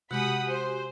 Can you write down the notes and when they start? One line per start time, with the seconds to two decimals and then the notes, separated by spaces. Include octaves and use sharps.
0.11 C3 G#3 F#4 G4 F#5 G#5 B5 D#6
0.48 C5